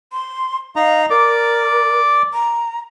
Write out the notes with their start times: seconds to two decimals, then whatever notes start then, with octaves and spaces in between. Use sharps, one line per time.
0.12 C6
0.76 D#4 F5 A#5
1.10 A#4 D5 D6
2.33 A#5